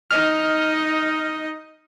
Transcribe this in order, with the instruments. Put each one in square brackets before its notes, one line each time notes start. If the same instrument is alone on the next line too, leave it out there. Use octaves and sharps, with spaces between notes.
[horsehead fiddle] D#4 D#5 [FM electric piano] F6